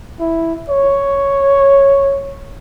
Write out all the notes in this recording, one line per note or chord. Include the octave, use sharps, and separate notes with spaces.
E4
C#5